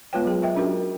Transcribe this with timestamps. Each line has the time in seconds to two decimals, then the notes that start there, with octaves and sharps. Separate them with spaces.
0.13 G#3 B3 F4 B4 C#5 G5
0.25 F#3 G#4
0.42 A#4 D#5 E5 G5
0.56 C#4 D4 F#4 G4 A#4